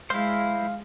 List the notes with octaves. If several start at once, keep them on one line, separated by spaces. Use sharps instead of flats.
G#3 E4 C5 F5